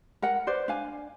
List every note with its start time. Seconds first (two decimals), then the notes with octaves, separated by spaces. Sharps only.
0.22 A#4 F#5
0.47 B4 C5 D5
0.68 D4 F5 G#5